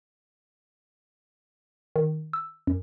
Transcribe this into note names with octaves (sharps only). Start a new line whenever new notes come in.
D#3
E6
F#2